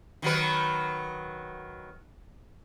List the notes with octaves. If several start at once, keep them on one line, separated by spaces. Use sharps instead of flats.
D#3 F#3 B4